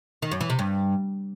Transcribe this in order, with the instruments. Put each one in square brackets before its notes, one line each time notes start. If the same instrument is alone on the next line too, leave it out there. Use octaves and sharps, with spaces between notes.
[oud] D#3
F#2
E3
C3
G2